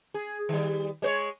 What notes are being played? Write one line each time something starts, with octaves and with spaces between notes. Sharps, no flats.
G#4
D#3 G3
G#3 C5 C#5